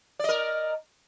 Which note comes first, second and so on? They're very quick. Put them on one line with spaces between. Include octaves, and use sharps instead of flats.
D5 D#5 A#4